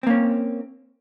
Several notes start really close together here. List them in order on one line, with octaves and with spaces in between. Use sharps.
C4 A#3 C#4